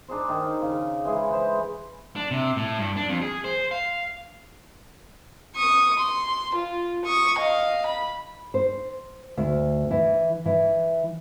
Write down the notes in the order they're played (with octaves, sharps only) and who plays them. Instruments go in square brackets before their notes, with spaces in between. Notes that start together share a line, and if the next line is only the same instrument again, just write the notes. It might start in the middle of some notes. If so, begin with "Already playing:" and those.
[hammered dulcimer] D4 D#4 G#4 C5
D#3 D#4
C#3
E3 G#3 G#4
B4 C5
[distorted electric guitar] D4
C3
A2
G2
D4
F2
G#4
C5
F5
[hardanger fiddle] C#6 D#6
C6
F4
C#6 D#6
D#5 F5
B5
[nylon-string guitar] C5
D2
E3
E3